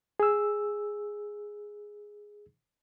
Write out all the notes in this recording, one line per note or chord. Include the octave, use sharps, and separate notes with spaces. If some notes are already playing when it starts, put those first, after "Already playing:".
G#4 E6